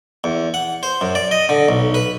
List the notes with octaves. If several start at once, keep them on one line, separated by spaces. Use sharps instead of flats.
E2
F#5
C5
F#2
D5
D#5
D3
B1
B4